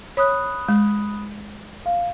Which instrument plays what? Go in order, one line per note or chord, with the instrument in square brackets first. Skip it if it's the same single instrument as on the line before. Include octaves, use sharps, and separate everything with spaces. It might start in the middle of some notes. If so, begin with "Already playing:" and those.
[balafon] C#5 [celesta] B5 D#6 F#6
[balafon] G#3
[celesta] F5